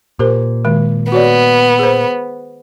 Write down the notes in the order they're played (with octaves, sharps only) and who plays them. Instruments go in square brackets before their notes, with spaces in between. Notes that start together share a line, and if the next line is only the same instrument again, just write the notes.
[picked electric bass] A#2 [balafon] G4 A#4 C5
[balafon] D#3 G#3
[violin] B3 [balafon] F#4 C#5 D5
[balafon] G#4 C5